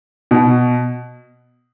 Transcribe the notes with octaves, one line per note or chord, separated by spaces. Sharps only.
B2